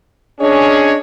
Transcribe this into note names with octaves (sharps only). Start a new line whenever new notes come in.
C#4 D4 G#4 C#5 D#5